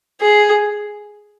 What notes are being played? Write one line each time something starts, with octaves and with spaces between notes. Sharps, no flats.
G#4